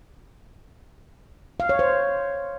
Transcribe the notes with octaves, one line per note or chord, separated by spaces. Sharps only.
F5
C#5
C5